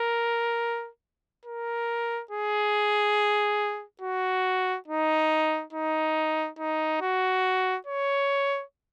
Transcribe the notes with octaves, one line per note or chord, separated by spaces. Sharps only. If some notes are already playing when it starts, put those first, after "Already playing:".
Already playing: A#4
A#4
G#4
F#4
D#4
D#4
D#4
F#4
C#5